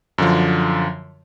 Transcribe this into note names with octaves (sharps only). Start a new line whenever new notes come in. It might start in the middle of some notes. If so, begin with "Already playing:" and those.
F#2 D3 F3